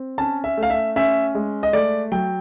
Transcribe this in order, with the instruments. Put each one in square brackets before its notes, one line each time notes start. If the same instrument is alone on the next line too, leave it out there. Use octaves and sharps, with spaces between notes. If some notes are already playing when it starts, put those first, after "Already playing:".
Already playing: [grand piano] C4
C#4 A5
E5
A3
F5
E5
C#4 E5
G#3
D#5
A3 D5
F#3 G5